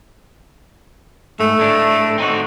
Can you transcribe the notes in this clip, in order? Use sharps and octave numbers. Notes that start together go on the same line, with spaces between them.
G#2 A3
A2 D4
C4 D#4 F#4